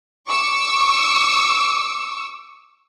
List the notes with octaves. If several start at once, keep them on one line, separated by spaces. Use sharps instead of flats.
C#6 D6 E6